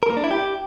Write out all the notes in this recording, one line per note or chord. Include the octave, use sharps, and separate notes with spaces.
A#4
A#3
D4
E4
G4